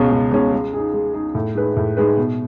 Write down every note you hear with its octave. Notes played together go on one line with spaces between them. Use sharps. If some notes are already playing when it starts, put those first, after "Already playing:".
Already playing: C#2 B2 G#3 C#4
C#2
B2 G#3 C#4
G#3
D#4 G#4
G#3
D#4 G#4
A2
G#3 D#4 G#4 B4
A2
G#3 D#4 G#4 B4
B2